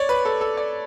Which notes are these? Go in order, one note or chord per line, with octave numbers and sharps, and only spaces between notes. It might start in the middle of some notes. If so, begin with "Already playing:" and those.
Already playing: C#5 D5
B4
A4
A4
D5